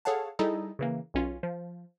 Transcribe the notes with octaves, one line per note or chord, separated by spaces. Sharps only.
G#4 A4 C#5 F5 F#5 A5
G3 D#4 E4 G#4 A4 D#5
C#3 E3 A#3
B1 C#4 F4
F3